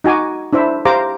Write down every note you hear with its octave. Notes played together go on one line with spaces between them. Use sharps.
D#4 F#4 G#5 D6
D4 E4 C5 E5
G4 C5 F5 A#5 D6